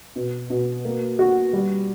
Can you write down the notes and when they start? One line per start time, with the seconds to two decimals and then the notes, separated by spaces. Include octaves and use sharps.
0.16 B2
0.50 B2
0.85 A#3
1.19 F#4
1.53 G3